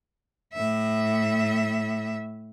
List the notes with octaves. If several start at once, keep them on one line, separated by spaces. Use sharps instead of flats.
A2 E5